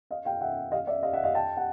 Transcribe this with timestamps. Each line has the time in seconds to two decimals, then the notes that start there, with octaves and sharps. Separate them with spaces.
0.11 D#5 F5
0.25 F5 G5
0.41 E5 F#5
0.72 D#5 F5
0.87 D5 E5
1.03 D#5 F5
1.13 E5 F#5
1.23 D#5 F5
1.35 G5 A5
1.57 F#5